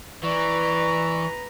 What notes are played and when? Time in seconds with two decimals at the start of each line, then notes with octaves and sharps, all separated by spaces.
0.23 E3 B4 D5 A#5 C#6